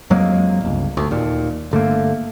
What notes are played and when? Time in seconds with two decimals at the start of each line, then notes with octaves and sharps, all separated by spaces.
0.10 F2 F#3 G#3 A#3
0.61 G1 C#2
0.97 D2
1.11 D#2 A#2
1.71 G1 D3 A3 A#3